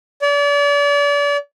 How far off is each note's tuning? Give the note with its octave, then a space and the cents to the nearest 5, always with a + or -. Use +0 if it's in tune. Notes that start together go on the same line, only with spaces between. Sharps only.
D5 -35